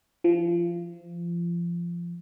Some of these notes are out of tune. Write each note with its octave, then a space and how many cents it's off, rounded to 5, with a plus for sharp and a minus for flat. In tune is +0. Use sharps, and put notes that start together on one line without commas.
F3 -25